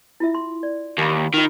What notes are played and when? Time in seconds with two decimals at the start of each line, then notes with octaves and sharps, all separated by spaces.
0.20 E4 F4 E5
0.35 C6
0.63 D5
0.98 D#2 F5 B5
1.34 D#3 F4 F5